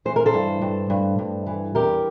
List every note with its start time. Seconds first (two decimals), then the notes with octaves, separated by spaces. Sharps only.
0.05 E3 C5
0.16 A#4
0.26 A4 C5
0.34 G2
0.62 G2
0.90 G2
1.19 G2
1.46 E3
1.75 E2 G4 A#4